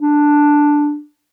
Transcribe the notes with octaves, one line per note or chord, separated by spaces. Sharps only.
D4